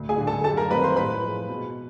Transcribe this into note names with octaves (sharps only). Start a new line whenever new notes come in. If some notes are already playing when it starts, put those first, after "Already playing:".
Already playing: D2
G#4 G#5
D3 G3
A4 A5
F#2 A4 A5
A#4 A#5
D#3 G3 C4 B4 B5
C5 C6
A2 B4 B5
F3 G#3
B2